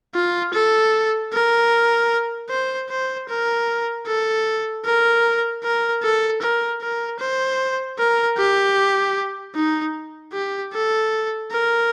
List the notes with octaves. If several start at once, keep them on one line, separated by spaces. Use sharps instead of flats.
F4
A4
A#4
C5
C5
A#4
A4
A#4
A#4
A4
A#4
A#4
C5
A#4
G4
D#4
G4
A4
A#4